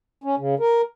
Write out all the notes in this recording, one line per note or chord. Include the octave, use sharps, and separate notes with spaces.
C#4
C#3
A#4